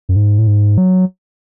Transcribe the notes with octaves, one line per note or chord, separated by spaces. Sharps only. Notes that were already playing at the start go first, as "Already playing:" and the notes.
F#2
G#2
A2
G#2
F#3